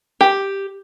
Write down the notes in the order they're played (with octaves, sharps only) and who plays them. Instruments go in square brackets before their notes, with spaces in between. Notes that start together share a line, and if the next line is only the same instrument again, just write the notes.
[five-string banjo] G4